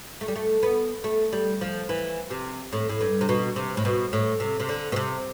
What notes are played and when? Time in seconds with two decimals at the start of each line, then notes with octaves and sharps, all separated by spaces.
0.21 A3
0.28 G3
0.36 A3
0.63 B3
1.04 A3
1.33 G3
1.61 F3
1.89 E3
2.30 C3
2.73 A2
2.89 A2
3.01 G2
3.21 C3
3.29 B2
3.56 C3
3.77 A2
3.85 B2
4.13 A2
4.40 C3
4.60 C3
4.69 D3
4.92 B2
4.96 C3